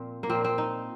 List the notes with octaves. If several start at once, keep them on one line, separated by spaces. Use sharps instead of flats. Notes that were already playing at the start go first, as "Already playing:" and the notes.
Already playing: A#2 F3 C4
A#3
A#2 F3 C4
C4
D#4